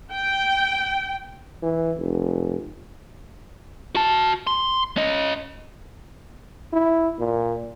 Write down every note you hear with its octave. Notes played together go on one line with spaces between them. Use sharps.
G5
E3
F1
F#4 A5
C6
C#4 D#5
E4
A#2